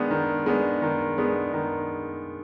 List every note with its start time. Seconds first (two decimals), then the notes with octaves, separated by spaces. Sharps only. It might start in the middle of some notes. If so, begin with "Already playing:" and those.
Already playing: D#3 G#3 B3 D4
0.11 D#3
0.46 G#3 B3 D4
0.82 D#3
1.18 G#3 B3 D4
1.53 D#3